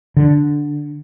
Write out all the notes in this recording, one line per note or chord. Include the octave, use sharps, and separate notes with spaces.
D3